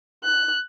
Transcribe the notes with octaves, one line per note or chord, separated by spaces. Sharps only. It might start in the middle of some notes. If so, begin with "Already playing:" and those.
F#6